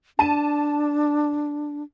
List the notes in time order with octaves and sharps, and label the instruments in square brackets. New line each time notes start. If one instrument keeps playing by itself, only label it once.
[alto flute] D4 [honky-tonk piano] A5 D#7